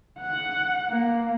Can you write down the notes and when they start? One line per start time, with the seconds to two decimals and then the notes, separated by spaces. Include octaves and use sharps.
0.19 F#5
0.89 A#3